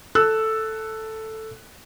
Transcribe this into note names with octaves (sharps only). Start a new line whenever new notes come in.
A4 E6 F#6